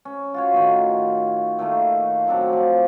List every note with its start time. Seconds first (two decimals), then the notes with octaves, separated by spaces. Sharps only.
0.05 C#4
0.34 F4 F#4 C#5
0.54 A2 D#3
1.59 A2 D#3 A3 A#3
2.26 A2 F#3 C4 D4
2.49 F3 D5